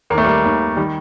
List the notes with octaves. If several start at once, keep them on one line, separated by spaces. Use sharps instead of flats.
D#2 D#3 A3 A#3
G3 A#3
D#2 D#3
D#3 G3